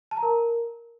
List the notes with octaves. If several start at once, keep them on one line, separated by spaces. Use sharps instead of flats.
A5
A#5
A#4